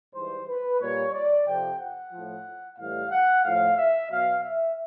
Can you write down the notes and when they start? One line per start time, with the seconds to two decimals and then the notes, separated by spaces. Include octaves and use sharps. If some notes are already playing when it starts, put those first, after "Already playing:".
0.14 G#2 E3 G3 C5
0.47 B4
0.80 A#2 G3 C#5
1.13 D5
1.46 F2 C3 F3 G5
1.79 F#5
2.12 A2 F3
2.78 A2 E3 G3 F5
3.11 F#5
3.44 A2 F3 F5
3.78 E5
4.10 B2 F#3 F5
4.43 E5